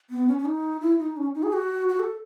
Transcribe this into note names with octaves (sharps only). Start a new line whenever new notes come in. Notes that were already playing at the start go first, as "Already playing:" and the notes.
B3
C#4
C#4
D#4
E4
D#4
C#4
D#4
G#4
F#4
F#4
A4